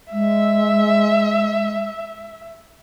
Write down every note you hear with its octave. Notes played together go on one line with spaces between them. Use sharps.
G#3 E5